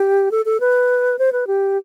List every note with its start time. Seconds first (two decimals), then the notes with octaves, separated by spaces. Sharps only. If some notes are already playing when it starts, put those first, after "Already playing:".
Already playing: G4
0.31 A4
0.45 A4
0.60 B4
1.19 C5
1.32 B4
1.47 G4